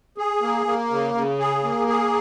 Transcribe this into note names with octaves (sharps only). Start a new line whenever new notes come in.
G#4
A#3
A#3
C#3
C#3
G#4
A#3
G#4